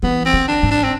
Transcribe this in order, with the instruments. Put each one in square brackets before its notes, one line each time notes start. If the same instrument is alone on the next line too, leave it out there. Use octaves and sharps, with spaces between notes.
[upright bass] E3 [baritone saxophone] B3
[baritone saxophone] C4
[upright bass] D3
[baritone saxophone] D4
[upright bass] G#2
[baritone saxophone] D4
C4